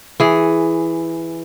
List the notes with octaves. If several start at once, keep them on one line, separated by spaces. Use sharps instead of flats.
E3 G#4